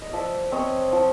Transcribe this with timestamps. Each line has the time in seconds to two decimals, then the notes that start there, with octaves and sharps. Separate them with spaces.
0.02 D#5
0.13 F3 D5 E5
0.52 C4 C#5 D#5
0.92 F3